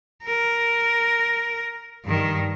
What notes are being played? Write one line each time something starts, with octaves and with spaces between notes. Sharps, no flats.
A#4
G2 D#3